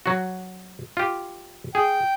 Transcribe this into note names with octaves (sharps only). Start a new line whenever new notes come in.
F#3 F#4
F4 G4
G#4 G5